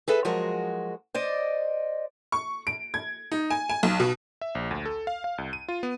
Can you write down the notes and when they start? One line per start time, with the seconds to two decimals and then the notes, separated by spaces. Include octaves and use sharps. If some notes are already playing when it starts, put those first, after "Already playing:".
0.08 G#4 A4 B4 E5
0.25 F3 F#3 G#3 F#4 G#4 A#4
1.14 C5 D5 D#5
2.32 C#6
2.67 D7
2.94 G#6
3.32 D#4
3.50 G#5
3.69 G#5
3.83 B1
4.00 B2
4.41 E5
4.55 A#1
4.71 D2
4.85 A4
5.07 F5
5.24 F5
5.38 C2
5.53 D#7
5.68 F4
5.83 B3